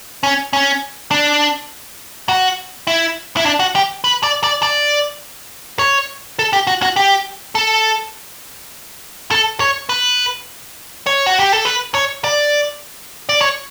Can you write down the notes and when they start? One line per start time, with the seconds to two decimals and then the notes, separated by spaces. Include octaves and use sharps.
0.23 C#4
0.53 C#4
1.11 D4
2.29 F#4
2.87 E4
3.37 E4
3.46 D4
3.60 F#4
3.75 G4
4.04 B4
4.23 D5
4.44 D5
4.63 D5
5.79 C#5
6.39 A4
6.53 G4
6.67 F#4
6.82 F#4
6.96 G4
7.55 A4
9.31 A4
9.60 C#5
9.89 B4
11.07 C#5
11.26 F#4
11.39 G4
11.53 A4
11.65 B4
11.95 C#5
12.24 D5
13.29 D5
13.41 C#5